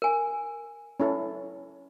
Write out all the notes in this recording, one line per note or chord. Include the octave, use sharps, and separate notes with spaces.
A#4 G#5
C#4 E4 A4